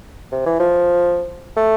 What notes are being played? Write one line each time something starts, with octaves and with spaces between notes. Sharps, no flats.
C3
E3
F3
A3